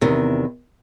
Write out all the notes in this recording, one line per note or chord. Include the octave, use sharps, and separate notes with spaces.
E2 C3 D#3